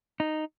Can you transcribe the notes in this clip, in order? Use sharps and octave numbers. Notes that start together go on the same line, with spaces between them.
D#4